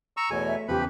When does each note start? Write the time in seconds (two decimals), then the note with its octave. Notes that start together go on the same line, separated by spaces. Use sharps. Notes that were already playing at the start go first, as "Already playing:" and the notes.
0.17 A#5 C#6 E6
0.30 E2 B2 A3 C#5 G#5
0.46 E5
0.68 E2 C#3 F3 G4 B4 B5